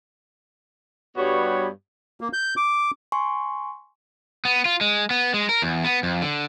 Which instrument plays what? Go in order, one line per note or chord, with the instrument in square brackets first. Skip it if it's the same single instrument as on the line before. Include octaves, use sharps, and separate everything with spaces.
[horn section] G2 G3 B3 F#4 C#5
[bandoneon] A#3
G6
D6
[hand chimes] G#5 C6 C#6
[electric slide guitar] B3
F4
G#3
B3
G#3
A#4
E2
B3
F2
D3